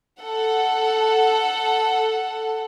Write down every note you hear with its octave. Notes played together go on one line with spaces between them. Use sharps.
A4 F#5